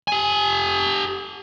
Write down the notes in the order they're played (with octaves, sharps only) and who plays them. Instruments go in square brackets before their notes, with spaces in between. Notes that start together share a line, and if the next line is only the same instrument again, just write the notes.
[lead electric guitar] G4 G#5